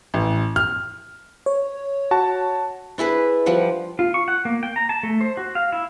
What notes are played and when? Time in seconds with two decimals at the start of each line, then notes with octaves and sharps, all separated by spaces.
0.14 A1
0.56 F6
1.46 C#5
2.11 F#4 A5
2.98 D4 E4 G#4 B4
3.46 F3 G3 F#5
3.99 F4
4.14 C#6
4.28 F#5
4.45 A#3
4.63 G5
4.76 A#5
4.89 A5
5.03 A3
5.21 C5
5.37 F#4
5.55 F5
5.72 E4